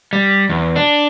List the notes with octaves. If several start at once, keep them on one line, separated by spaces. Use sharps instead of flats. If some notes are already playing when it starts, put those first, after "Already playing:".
G3
E2
D4